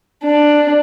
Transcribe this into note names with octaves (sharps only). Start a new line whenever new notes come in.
D4